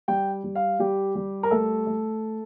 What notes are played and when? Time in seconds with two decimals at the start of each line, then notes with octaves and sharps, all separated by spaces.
0.08 G3 G5
0.44 G3
0.55 F5
0.80 G3 G4
1.15 G3
1.43 A#4
1.51 A3 A4
1.87 A3